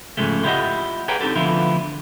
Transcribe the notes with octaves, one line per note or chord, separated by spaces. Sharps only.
G#2 C#3 F3 G#3 A3
E4 F4 G4 C#5 D#5 F#5
G#4 B4 C#5 F#5 G5 A#5
C4 D#4 F4 G4 A4
D2 D3 F3 B3 E4 F4